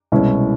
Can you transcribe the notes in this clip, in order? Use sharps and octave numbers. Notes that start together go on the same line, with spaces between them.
C2 B2 G#3 C#4 E4